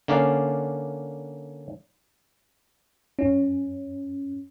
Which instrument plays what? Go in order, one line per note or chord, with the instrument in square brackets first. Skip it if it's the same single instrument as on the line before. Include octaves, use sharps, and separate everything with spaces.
[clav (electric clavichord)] D3 A#3 C#4 D5 F5
[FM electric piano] F#2 C#4